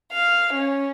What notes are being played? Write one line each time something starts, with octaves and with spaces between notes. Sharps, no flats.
F5
C#4